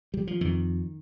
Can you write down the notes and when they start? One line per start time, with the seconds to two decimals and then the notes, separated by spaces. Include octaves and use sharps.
0.14 G3
0.27 F3
0.41 F2 D#3